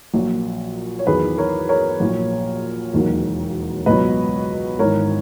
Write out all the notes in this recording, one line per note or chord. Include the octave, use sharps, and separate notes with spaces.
A#1 A#2 F#3
C#5
E2 D#3 F#3 G#4 B4
A#4 C#5
A#4 C#5
A#1 A#2 F#3
E1 D#2 D#3 F#3
C#2 B2 F#3 B4 D#5
G#1 G#2 E3 A#4 C#5